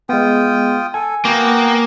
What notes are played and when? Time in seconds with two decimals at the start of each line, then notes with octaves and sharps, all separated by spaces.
0.09 G#3 B3 F4 G5 D#6
0.94 A4 G#5
1.25 A#3 B3 F#4 G5